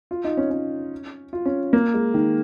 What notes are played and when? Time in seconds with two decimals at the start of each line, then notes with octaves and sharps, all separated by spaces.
0.11 F4
0.24 D#4
0.37 C#4
0.50 C#4
1.33 F4
1.46 C#4
1.73 A#3
1.94 G#3
2.14 D#3